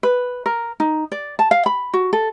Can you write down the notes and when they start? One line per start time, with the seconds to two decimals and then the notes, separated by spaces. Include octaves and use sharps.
0.03 B4
0.46 A#4
0.80 D#4
1.12 D5
1.39 A5
1.51 F5
1.66 B5
1.94 F#4
2.13 A4